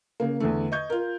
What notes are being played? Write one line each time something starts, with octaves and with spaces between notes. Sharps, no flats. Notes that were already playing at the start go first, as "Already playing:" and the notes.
C#3 A#3
E2 D3 A3
D#5 C#6 G6 G#6
F4 A#4